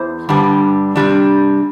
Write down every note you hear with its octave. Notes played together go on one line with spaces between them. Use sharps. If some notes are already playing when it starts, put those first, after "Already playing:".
Already playing: E2 E3 C5
G2 D3 G3
C3 G3 D4